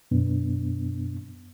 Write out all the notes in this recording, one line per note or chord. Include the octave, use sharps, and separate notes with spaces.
F#2 B2 B3 D4